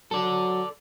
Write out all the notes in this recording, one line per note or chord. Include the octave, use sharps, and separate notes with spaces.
F#3 A4 D5